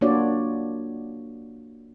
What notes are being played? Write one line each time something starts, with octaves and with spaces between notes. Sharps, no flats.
A#3 D4 F4 F#4 C#5 D5